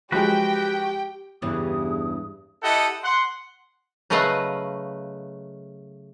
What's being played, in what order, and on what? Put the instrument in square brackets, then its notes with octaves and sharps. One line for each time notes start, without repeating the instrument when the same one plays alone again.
[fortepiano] F3 F#3 G#3 [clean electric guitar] F#4 B4 [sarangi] G4 [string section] G5
[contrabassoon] E2 [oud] G2 C#3 E3 [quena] D#6
[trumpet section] E4 G4 A4 D#5 F#5
F#5 C6
[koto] C#3 F#3 A3 B4 D#5 F5